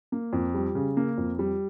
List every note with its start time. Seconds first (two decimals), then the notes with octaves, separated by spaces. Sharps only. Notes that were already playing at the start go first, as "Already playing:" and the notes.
0.12 A#3
0.33 F2
0.55 G3
0.75 C#3
0.97 A#3
1.18 F2
1.39 G3